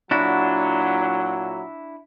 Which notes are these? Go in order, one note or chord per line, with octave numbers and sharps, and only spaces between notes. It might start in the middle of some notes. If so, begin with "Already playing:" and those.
A#2 F#3 D4 E4 F#4